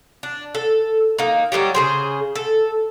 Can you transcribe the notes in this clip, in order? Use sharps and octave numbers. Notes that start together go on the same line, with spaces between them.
D4
A4
A#3 D#4
F#3 G3 D#4 G4
C#3 G#4 C5
A4